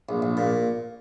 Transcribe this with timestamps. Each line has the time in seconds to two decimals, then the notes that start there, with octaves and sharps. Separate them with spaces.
0.09 A#1
0.22 A#1
0.37 A#2